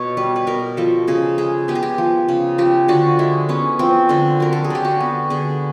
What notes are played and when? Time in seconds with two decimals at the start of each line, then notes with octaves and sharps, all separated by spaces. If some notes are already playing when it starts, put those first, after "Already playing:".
Already playing: B2 B3 C#5
0.17 G3 B4
0.36 B4
0.47 B2 A#4
0.77 F3 A4
1.08 C#3 G#4
1.38 G#3 G#4
1.68 B3 G4
1.75 G#4
1.83 G4
1.98 F3
2.28 C#3
2.58 F3 G4
2.88 D3 F#4
3.19 G#3 E4
3.49 B3 C#4
3.79 F3 C4
4.09 D3 C4
4.40 F#3 A#4
4.53 A4
4.64 G#4
4.70 D3 G4
4.85 F#4
5.00 B3
5.30 D3 G#4